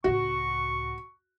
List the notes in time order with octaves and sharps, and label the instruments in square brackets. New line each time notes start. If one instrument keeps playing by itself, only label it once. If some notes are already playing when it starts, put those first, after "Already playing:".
[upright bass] C#2 A2 [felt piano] F#4 [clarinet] C#6